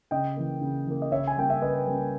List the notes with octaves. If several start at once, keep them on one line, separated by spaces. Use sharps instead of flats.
C#3 D#5 G5
E3 A#3
C#3
E3 A#3
D#5
C#3 C#5 E5
G#5
G3 A#3 C#4 G5
E5
C#3 B4 D#5
G3 A#3 C#4